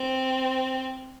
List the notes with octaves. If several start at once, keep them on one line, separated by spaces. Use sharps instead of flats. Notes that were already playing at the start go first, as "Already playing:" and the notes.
Already playing: C4